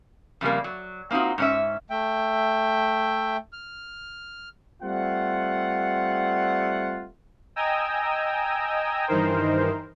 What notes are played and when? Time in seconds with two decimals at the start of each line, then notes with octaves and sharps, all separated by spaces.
0.41 F2 C#3 G3 A#3
0.64 F#3
1.11 A#3 C4 D#4 F4 F#4
1.38 G#2 C#4 E5
1.90 A3 E5 G5
3.53 F6
4.83 G3 A3 C4 F4 F#5
7.56 D#5 G5 G#5 A#5 D#6 E6
9.08 G2 D#3 E3 D#4 A#4 C5